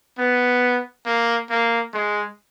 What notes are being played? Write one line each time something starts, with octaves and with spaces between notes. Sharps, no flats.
B3
A#3
A#3
G#3